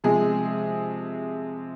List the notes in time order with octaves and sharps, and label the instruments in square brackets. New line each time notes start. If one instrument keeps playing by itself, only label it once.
[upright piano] C3 F3 G#3 G#4